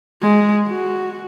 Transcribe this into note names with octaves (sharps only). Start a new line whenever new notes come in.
G#3
F#4